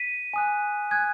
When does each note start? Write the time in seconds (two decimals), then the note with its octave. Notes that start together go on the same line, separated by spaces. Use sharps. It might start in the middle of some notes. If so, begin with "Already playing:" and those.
Already playing: B6 D#7
0.34 G#5 D#6 F#6
0.91 G#5 D#6 F#6 G#6